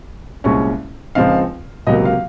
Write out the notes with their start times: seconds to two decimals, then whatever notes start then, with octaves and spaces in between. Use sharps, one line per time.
0.44 C2 A#2 G#3 C#4 C#6
1.15 C#2 C#3 F3 C4 D#4 F5
1.87 C#2 C3 F#3 A#3 D#5
2.05 F5